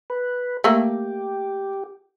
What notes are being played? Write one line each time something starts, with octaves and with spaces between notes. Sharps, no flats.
B4
A3 A#3 G4